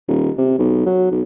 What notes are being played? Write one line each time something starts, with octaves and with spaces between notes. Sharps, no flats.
D#1
C3
B1
F#3
B1